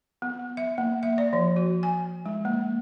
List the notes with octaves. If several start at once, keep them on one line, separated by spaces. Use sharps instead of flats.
B3
E5
A#3
E5
D5
F3
F#4
G#5
G#3
A#3